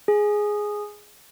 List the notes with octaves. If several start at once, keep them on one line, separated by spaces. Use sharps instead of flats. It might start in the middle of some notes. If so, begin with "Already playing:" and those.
G#4